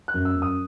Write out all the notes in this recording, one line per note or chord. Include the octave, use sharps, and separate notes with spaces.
F#6
F#2
E6
F#2
D#6